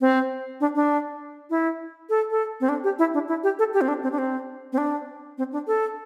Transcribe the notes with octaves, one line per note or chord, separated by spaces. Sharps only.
C4
D4
D4
E4
A4
A4
C4
D4
G4
E4
D4
E4
G4
A4
G4
C4
D4
C4
D4
C4
C4
D4
C4
D4
A4